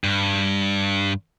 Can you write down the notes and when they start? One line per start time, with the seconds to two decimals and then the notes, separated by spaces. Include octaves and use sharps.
0.04 G2